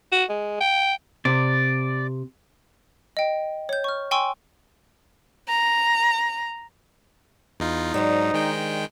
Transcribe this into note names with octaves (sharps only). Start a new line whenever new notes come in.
F#4
G#3
G5
C3 D5
D#5 G5
C#5 G6
C#6 F6
G5 G#5 C6 C#6 E6
A#5
E2 D#4 F4
G#2 F#3 D4 D#4 G4 C5
D#3 G#3 G5